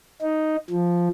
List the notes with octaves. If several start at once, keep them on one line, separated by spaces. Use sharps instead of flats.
D#4
F3